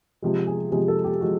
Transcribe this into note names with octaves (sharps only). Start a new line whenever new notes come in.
C3 F3 G#3
G#4
C3 F3 G#3 G#4
A4
G4
F3 G#3 F#4